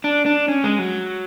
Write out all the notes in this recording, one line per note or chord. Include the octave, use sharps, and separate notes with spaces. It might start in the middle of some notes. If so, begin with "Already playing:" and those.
D4
D4
C#4
G#3
F#3